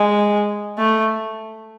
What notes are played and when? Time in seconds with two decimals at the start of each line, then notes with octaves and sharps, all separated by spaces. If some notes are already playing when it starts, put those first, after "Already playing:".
Already playing: G#3
0.79 A3